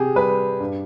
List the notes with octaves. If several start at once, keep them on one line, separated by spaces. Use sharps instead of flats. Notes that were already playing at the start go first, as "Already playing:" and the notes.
Already playing: C3 G4 G#4
G3 B4
G2